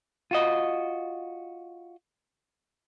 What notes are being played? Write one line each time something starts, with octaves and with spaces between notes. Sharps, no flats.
F4 F#4 D#5